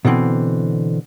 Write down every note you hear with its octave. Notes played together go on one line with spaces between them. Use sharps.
B2 D3 E3 C4